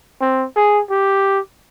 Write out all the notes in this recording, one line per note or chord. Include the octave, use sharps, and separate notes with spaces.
C4
G#4
G4